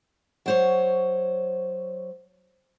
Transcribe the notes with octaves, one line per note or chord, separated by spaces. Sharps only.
F#3 C5 C#5